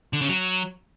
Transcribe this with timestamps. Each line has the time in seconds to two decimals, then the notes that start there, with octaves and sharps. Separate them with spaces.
0.13 D3
0.21 C#3
0.29 F#3